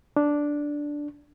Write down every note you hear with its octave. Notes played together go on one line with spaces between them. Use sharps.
D4